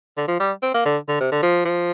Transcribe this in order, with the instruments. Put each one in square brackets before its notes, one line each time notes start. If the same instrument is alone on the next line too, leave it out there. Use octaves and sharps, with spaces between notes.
[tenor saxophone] D3
F3
G3
C4
A#3
D3
D3
C3
D3
F3
F3